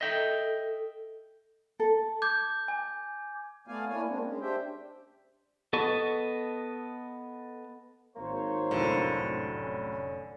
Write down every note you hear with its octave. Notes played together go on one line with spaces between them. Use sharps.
A4 D#5 E5 G5
A4
D6 G6 G#6
G#5
A3 B3 D5 F5 G#5
A#3 D4 E4 C#5 G#5
G#3 A#3 C4 D4
G#3 C#4
D4 G4 C5 E5 G5
B3 A4 D#5 C#6
G#1 A#3 C5 C#5
F1 A2 D3 F#3
C#4